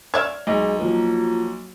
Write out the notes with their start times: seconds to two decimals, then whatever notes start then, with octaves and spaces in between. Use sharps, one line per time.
0.14 C#5 D5 E5 F6 G#6
0.47 B1 G#3 D#4
0.79 F3 F#3 A#3